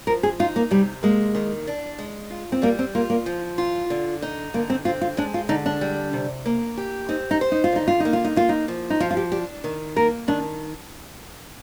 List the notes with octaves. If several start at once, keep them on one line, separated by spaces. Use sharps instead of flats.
F3 A#4
G#4
D#4 F4
A#3
C3 G3
G#3 A#3
D#3
D4
G#3
F4
C4
G3 A#3
C4
A#3 F4
A#3
F3
F4
D3
D#4
D3 A#3
C4
C4 F4
F4
G#3 D4
F4
D3 D#4
D4
G3
C3
A#3
G4
C4 D#4
D#4
C5
D#4
F4
D3 D#4
F4
A#3 D#4
F4
D#4
A#3 F4
D#4
F3
D#4
F3 F4
F4
G4
D4 G4
D#3
A#3 A#4
D#3 D4